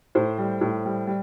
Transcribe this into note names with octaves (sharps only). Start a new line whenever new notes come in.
A2 C5
G3
A2
G3
G3